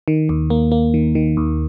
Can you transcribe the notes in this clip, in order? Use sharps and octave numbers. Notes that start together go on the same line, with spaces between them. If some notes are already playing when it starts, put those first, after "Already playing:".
D#3
D#2
A#3
A#3
D#3
D#3
D#2